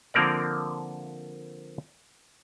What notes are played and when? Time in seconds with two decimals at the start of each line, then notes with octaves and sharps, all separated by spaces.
0.14 D3 F3 A#3 C4 A#4 D5